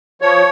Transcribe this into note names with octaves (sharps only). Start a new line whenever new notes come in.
F3 C#5